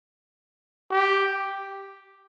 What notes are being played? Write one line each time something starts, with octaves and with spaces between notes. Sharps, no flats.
G4